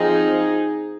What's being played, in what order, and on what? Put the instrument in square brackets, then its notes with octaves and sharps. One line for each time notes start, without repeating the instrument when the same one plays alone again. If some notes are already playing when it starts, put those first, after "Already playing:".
Already playing: [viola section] F3 C4 D#4 G#4